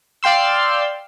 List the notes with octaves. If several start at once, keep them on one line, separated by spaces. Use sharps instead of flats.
D5 F5 G5 C6 E6